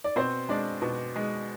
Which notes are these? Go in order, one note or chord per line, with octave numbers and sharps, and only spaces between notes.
D5
B2 C4 C5
G#3 D4 D5
B2
G#3